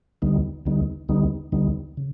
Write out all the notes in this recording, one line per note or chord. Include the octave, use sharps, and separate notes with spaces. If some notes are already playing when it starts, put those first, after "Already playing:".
D2 D3 G3 B3 D#4
D2 D3 G3 B3 D#4
D2 D3 G3 B3 D#4
D2 D3 G3 B3 D#4
C#3